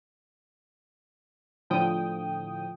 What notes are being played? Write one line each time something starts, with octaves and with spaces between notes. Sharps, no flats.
A2 D3 F3 G5 D#6